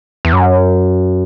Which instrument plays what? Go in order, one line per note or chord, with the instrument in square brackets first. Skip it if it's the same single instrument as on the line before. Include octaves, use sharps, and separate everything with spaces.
[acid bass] E2
F#2